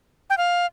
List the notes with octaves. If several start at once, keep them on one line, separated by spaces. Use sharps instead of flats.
G5
F5